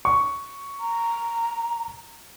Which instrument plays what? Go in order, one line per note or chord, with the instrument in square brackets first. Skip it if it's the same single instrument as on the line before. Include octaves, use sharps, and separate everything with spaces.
[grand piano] C#6
[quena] A#5